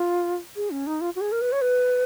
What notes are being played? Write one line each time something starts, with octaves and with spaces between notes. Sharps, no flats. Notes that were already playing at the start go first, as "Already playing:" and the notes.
Already playing: F4
G#4
C#4
D#4
F4
F#4
G#4
A#4
B4
C#5
B4